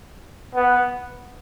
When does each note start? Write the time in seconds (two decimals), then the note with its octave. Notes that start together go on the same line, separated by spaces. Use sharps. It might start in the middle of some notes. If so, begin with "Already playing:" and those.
0.55 B3